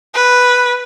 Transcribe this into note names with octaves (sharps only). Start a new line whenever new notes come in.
B4